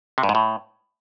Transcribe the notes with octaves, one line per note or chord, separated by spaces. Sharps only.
C3
G2
G#2
A2